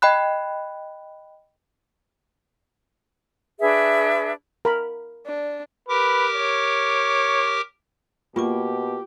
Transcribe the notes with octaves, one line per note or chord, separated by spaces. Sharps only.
D#5 G5 B5 F#6
D4 G#4 B4 E5
A#4 B5
D4
G4 A#4 B4 D6
C#5
B2 A#3 F4 G4 C#6 D6